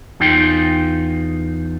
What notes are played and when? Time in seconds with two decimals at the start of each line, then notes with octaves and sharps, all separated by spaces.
0.20 E2 D#4 F4 G5